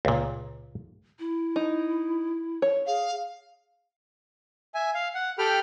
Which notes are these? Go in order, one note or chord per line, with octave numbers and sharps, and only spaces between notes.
C#2 A#2
E4
D#4
C#5
G#4 F5
E5 G#5
F5
F#5
G4 A4 G5 B5 F6